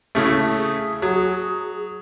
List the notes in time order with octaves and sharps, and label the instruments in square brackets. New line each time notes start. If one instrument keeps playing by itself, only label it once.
[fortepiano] A2 C#3 A3
[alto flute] G#4
[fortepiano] F#3